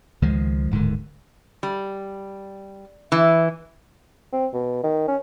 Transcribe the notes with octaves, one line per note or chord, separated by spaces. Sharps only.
C#2 D#3 F3 G#3
D1 G#2 D3 D#3
G3
E3
C4
B2
D#3
C#4